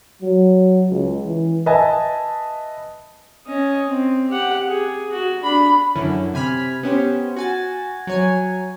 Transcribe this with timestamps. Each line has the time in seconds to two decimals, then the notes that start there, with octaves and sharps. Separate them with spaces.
0.22 F#3
0.90 C#2
1.25 E3
1.66 B4 D#5 E5 G#5 A5
3.47 C#4 D#5
3.90 C4
4.29 G4 F#5
4.68 G#4
5.12 F#4
5.43 D4 B5
5.95 F#2 D3 C#4 E4
6.34 C3 G#5 B5 F6 B6
6.83 B3 C#4 G4 C5
7.36 F#4 G#5 A6
8.07 F#3 C#5 G#5